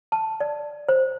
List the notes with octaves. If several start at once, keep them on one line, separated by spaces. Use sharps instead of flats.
A5
D5
C5